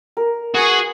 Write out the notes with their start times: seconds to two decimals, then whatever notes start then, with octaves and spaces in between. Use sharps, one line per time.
0.17 A#4
0.55 F#4 G#4 B4